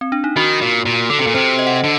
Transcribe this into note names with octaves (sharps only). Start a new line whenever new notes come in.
C4
D4
D#4
D#3 F#4
A#2
A#2
D3 A4
C3
A#2
C3 C5
D#5
F#5
D#5
D3